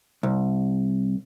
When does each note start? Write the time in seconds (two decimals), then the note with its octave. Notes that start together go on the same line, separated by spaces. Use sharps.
0.23 C2